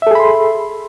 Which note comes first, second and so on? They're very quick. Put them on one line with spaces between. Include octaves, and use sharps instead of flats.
E5 A4 G#4 B5 C6